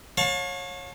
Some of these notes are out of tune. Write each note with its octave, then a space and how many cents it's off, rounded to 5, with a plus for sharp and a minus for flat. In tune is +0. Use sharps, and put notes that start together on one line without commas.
C#5 -15 F5 +40 A5 +0